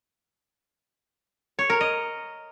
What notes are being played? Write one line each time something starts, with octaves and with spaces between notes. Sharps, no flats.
C#5
A#4
D#5